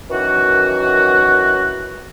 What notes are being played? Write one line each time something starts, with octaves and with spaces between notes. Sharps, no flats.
F#2 D#3 E3 F#4